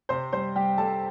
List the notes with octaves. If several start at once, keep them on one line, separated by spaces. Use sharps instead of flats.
C3 C5 C6
G3 C5 C6
G3 G4 G5
G3 A4 A5